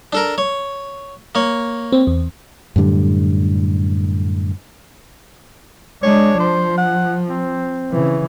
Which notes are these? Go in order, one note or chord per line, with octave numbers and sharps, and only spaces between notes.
D4 A4 A#4
C#5
A#3 C#5
C4
E2
F#2 A2 D3 G3
G#3 D4 C#5
F3 C5
F#5
C4
C#3 E3